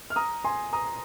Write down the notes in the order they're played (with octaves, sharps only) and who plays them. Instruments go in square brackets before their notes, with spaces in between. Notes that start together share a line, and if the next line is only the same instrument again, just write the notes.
[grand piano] F6
A#5 D#6
G#5 C6
A#5 D#6